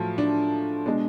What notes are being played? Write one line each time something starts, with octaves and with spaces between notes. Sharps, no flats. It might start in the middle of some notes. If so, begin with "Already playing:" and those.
Already playing: A2 F3 F#3 A3 F4
D4
B2 G#3 D4